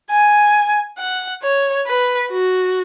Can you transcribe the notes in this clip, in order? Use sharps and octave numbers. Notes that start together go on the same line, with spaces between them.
G#5
F#5
C#5
B4
F#4